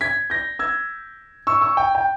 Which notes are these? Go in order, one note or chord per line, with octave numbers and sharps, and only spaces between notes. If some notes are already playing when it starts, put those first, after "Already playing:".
G#6 B6
G6 A#6
E6 G#6
C#6 E6
C#6 E6
G5
G5